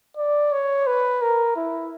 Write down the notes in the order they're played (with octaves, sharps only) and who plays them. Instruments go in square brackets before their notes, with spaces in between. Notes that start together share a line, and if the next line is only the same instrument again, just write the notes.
[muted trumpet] D5
C#5
B4
A#4
E4